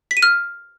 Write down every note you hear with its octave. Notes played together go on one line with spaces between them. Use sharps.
B6
D#7
F6